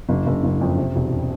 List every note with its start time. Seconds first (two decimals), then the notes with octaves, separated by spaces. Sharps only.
0.09 F#1
0.26 F#1
0.44 F#1
0.61 F2
0.77 C3
0.96 E1